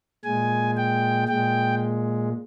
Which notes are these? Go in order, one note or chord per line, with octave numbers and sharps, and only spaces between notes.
A#2 G#3 G#5
G5
A#2 G#3 G5